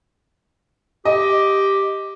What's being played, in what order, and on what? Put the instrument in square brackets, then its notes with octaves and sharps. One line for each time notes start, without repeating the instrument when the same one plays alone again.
[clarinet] G4 [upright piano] D#5